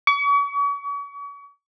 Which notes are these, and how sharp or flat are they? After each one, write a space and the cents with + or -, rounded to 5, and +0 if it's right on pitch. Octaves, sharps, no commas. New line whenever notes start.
C#6 +40